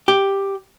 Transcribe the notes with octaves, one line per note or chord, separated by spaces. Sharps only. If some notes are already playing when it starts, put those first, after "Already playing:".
G4